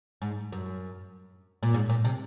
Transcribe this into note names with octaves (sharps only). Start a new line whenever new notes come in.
G#2
F#2
A#2
G#2
A#2
C3